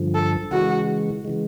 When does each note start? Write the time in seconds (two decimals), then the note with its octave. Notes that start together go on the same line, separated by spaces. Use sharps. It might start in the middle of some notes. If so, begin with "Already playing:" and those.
Already playing: G2 D3 F3
0.15 A4
0.51 C#3 E3 G#3 F#4
1.25 C#3 E3 G#3